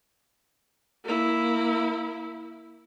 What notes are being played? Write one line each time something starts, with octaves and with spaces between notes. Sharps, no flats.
A#3 E4